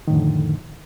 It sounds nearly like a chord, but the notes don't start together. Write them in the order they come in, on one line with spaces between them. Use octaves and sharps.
D#3 A2 F2 D3